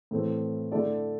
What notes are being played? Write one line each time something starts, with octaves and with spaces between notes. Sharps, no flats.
A2 E3 A3 C4
D3 A3 E4 A4 D5